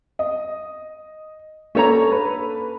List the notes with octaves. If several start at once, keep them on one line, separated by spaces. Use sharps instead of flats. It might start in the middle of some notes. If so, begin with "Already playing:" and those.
D#5
A#3 C#4 D4 A4 C#5 A#5
B4